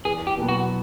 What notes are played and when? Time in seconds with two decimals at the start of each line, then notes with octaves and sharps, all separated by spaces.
0.05 E2 G#4
0.27 G4
0.37 B2 F#3 B3
0.49 F#4